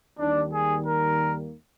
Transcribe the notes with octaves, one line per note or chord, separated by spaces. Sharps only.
D#2 D#3 G3 A#3 D4
G#4
A#4